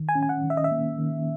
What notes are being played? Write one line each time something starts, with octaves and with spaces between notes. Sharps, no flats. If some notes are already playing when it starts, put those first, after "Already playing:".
Already playing: D#3
G#5
C#4
G#5
F#5
D#3
E5
D#5
E5
A#3
D#3